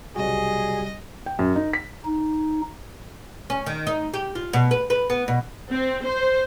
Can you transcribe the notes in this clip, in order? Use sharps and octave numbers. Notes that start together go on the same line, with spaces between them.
B1 C3 G3 F#4 G#4 D#5
G5
F#2
D#4
B6
D#4
C#4
D#3
D#4
G4
F4
B2
B4
B4
B3
B2
C4
C5